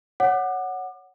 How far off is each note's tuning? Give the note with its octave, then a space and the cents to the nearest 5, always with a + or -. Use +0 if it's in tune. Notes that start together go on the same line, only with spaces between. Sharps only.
C#5 +0 F#5 +0 D6 +35